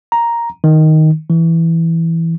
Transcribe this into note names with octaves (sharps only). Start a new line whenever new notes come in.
A#5
D#3
E3